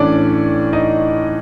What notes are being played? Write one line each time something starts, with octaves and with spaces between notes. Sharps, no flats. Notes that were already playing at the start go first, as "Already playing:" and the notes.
Already playing: A2 E3 C#4 D4 D5
D#4 D#5